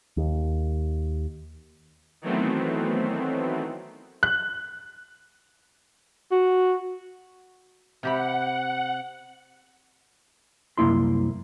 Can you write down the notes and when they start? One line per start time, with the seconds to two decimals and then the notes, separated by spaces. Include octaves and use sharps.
0.17 D#2
2.22 D#3 E3 F#3 A3 B3 C4
4.23 F#6
6.32 F#4
8.03 C3 G4 F#5 B5
10.78 C2 F#2 A#3 E4 C6